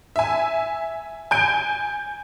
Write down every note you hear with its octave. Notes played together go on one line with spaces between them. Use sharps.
E5 G#5
G#5 G6 D7